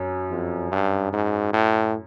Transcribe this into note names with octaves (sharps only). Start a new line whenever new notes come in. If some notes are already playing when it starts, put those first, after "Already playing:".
Already playing: F#2 C#4
F2
G2
G#2
A2